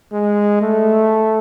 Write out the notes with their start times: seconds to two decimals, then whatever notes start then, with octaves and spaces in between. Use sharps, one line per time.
0.12 G#3
0.62 A3